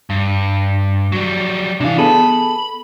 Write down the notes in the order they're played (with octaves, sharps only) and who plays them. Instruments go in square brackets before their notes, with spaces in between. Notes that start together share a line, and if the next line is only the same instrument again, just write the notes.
[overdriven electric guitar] G2
F#3 G3
[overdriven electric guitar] C3 F5 [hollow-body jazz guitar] E3 D4
[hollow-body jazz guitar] B3 G#4 A4 [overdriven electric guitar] B5